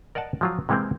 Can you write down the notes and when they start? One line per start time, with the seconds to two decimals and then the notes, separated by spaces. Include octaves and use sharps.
0.15 A#4 D5 D#5 F#5 A5
0.41 F3 F#3 F4
0.69 C3 E3 G#3 A#3 C4